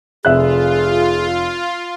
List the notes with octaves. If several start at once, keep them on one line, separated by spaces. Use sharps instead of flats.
F1 F4 G#4 E5 F#6